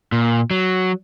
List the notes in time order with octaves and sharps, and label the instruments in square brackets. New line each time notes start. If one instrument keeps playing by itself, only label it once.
[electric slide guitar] A#2
F#3